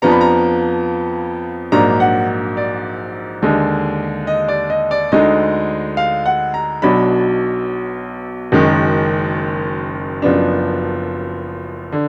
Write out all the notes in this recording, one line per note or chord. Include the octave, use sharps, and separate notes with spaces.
F2 F3 B3 D4 A#5
B5
A#5
A#1 G#2 F#3 A#3 D4 A#5
F#5
D5
D#2 D3 G#3
D#5
D5
D#5
D5
D2 D3 G#3 D#4 D#5
F5
F#5
A#5
B1 B2 F#3 D4 B5
F#1 F#2 D#3 G#3
F#1 F#2 F3 B3 D4
D3